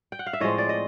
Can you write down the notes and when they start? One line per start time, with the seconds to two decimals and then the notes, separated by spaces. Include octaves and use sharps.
0.12 G5
0.19 F#5
0.26 F5
0.33 E5
0.40 A2 F3 G#3 C4 C#5 D#5
0.58 D5
0.69 D#5